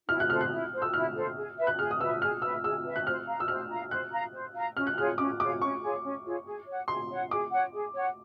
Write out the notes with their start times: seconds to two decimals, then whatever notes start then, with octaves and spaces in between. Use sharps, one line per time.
0.09 E4 F6
0.20 F#6
0.30 A4 C5 F6
0.41 F#6
0.51 E4
0.73 A4 C5
0.82 E6
0.94 E4 F6
1.15 A4 C5
1.36 G#4
1.57 B4 E5
1.67 F#6
1.79 G#4 F6
1.91 D#6
2.00 B4 E5 E6
2.21 G#4 F6
2.42 B4 E5 E6
2.64 G#4 E6
2.84 B4 E5
2.96 F#6
3.06 C5 F6
3.28 F5 A#5
3.40 E6
3.48 C5 F6
3.70 F5 A#5
3.91 C5 F#6
4.12 F5 A#5
4.33 C5
4.55 F5 A#5
4.76 C#4 F6
4.87 F#6
4.97 F4 G#4 C#5 F6
5.18 C#4 D6
5.40 F4 G#4 C#5 D6
5.61 C#4 C#6
5.82 F4 G#4 C#5
6.03 C#4
6.25 F4 G#4 C#5
6.46 G#4
6.67 C#5 F#5
6.88 G#4 C6
7.10 C#5 F#5
7.30 G#4 D6
7.52 C#5 F#5
7.74 G#4
7.94 C#5 F#5